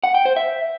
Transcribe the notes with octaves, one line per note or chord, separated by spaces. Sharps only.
F#5
G5
C5
E5